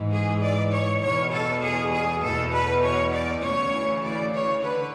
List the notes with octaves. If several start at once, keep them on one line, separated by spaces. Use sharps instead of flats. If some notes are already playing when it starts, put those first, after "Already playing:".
Already playing: G#2 E3
G#4
D5
C#5
E2 B2 C#5
A4
G#4
G#4
E2 B2 A4
B4
C#5
D5
D2 C#3 E3 C#5
D5
C#5
D3 B4